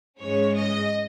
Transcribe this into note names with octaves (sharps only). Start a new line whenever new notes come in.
G#2 E3 G#3 C#4 C#5
D#5